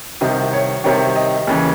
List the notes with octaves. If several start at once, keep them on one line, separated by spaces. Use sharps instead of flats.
C2 C3 D#3 D#5
C#5
C2 C3 D#3 C#5
D#5
D#2 C#3 E3